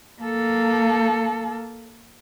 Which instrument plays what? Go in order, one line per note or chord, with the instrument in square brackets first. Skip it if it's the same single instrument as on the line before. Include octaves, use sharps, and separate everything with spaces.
[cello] A#3 A4